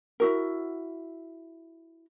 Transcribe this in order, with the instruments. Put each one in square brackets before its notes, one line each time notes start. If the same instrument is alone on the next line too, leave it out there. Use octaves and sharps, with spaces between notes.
[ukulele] E4 F#4 A#4